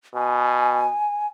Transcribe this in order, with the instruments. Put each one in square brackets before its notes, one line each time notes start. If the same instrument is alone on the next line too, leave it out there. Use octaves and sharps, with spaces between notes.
[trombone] B2 [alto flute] G#5